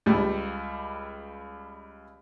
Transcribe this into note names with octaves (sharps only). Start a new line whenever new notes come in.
C#2 G3